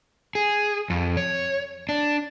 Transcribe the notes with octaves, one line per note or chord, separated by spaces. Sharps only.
G#4
F2
C#5
D4